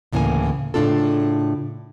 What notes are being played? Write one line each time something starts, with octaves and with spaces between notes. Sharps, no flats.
D2 A2 C#3 E3 A#3 G#5
A2 C#3 C4 D4 F4 A4